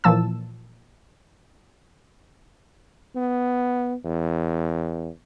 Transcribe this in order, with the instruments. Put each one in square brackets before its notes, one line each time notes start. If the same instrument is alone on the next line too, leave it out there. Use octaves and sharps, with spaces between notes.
[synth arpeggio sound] A#2 E3 F3 A5 E6
[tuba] B3
E2